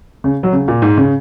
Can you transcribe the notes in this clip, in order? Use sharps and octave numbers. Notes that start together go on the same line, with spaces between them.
C#3
F#3
C#3
A#2
G#2
C#3